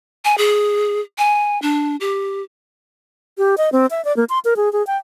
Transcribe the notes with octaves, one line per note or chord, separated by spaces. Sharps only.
G#5
G#4
G#5
D4
G4
G4
D#5
C4
E5
D5
A#3
C6
A#4
G#4
G#4
G5